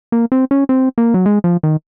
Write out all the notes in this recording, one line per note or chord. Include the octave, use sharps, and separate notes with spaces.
A#3
C4
C#4
C4
A#3
F#3
G#3
F3
D#3